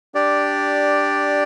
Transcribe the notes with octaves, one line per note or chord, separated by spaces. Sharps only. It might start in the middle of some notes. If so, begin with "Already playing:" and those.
D4 G4 D5